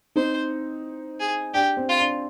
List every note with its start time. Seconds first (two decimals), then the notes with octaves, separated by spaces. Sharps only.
0.16 C4 D#4 C5
1.20 G#4
1.54 D4 G4
1.77 C4
1.89 F4
1.99 D4